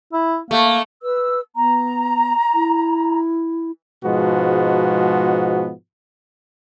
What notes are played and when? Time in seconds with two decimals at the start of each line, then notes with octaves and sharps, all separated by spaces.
0.13 E4
0.51 A3 A#3
1.03 B4 E6
1.56 B3 A#5
2.54 E4
4.04 G#2 B2 F3 G#3 B3 F#4